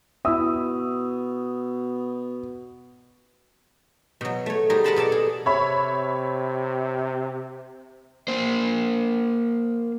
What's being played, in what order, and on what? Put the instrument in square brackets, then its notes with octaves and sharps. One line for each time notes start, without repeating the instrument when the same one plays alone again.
[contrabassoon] B2 [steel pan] E4 E5 [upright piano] D#6 E6
[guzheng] B2 F#3
A3 C#5
G3 D#4 G#4 A#4 C5
A#4 B4 F#5 A5 B5 C6
B2 A4 D5 A5
G#4
[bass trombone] C3 [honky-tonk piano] C#5 E5 B5
[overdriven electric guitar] A#3 C5